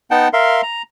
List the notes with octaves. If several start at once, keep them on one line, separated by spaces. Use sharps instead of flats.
B3 D#4 F#5 G5 A5
A#4 E5 F5 C6
A#5